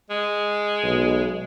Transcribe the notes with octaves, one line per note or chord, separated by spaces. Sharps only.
G#3
B1